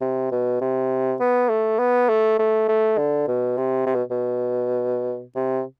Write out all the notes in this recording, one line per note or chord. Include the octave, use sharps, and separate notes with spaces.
C3
B2
C3
B3
A3
B3
A3
A3
A3
D3
B2
C3
C3
B2
B2
C3